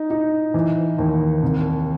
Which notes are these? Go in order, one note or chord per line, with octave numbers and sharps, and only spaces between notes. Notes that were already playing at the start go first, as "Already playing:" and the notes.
Already playing: D#4
D#4
E3
D#2
C2